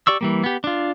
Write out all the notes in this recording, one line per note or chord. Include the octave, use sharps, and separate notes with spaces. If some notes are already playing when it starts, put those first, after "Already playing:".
G4 D5 C#6 E6
E3 G3 A#3
B3 G4
D4 F4